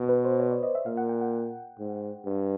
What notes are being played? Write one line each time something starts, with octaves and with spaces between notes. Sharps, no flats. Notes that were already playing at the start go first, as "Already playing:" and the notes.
Already playing: B2
B4
C5
C#5
D5
D#5
E5
A#2 F5
F#5
G5
F#5
G#2
G2